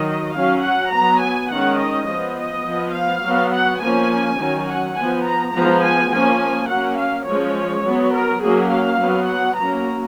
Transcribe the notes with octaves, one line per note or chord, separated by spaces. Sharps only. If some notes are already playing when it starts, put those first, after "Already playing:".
Already playing: D#3 F#3 D#5
F#3 C#4 F5
F#5
F#3 B3 A#5
G#5
D#3 G#3 C#4 F#5
D#5
F3 B3 D#5
D#5
F3 B3
F5
F#3 B3
F#5
F3 A#3 C#4 G#5
D#3 F#3 C#4
F#5
F3 B3 G#5
A#5
F3 G#3 B3 A#5
G#5
F3 A#3 C#4 G#5
F#3 A#3 C#4 F#5
F5
F3 G#3 C#4 C#5
F#3 B3
A#4
F#3 A#3 C#4 G#4
F5
F#3 B3
F#5
F#3 A#3 C#4 A#5